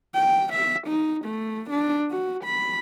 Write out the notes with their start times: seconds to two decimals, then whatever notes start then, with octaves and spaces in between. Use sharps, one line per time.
0.15 G5
0.53 E5
0.88 D#4
1.25 A3
1.70 D4
2.11 F#4
2.44 B5